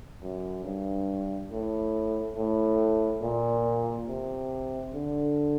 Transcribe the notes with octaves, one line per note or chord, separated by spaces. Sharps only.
F#2
G2
A2
A2
A#2
C3
D3